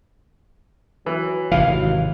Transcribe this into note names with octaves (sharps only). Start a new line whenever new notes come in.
E3 F#3
G#1 C3 E3 F5